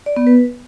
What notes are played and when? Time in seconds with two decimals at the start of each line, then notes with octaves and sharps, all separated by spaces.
0.06 D5
0.17 B3
0.27 B4